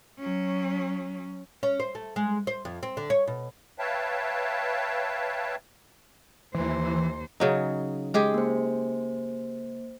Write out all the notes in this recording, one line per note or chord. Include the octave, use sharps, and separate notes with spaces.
F#3 C#4
C#4
C5
A3
G#3
C5
F2
C4
D3
C#5
B2
B4 C#5 E5 F5 G5 A5
D#2 E3 C5
C#3 F#3 D#4
G#3 G4 G#4
A#3 C5